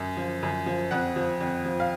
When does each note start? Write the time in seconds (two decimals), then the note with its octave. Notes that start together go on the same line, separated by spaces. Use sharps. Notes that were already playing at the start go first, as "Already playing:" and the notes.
Already playing: F#2
0.17 F3
0.43 F#2
0.66 F3
0.91 F2 F#5
1.16 F3
1.40 F2
1.65 F3
1.80 F5